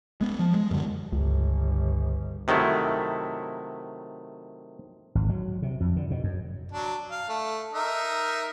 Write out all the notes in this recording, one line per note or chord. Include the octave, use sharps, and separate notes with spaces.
G#3 B3
F3
G#3
F#2 D3
G1 C#2
C3 D#3 F#3 A3 E4
G#1
F#3
C3
F2
D3
B2
F#2
F#3 D4
F5
A3
D#4 A#4 E5